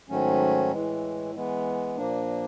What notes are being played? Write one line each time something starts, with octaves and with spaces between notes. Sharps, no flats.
G#2 D#3 F#3 A3 C#4
A2 E3 G#3
E3 G#3 B3
A#2 F3 A#3 D4